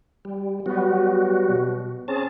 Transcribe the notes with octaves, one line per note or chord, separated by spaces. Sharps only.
G3
F#3 G3 B3 F#4
B2
C4 C#4 G#4 A5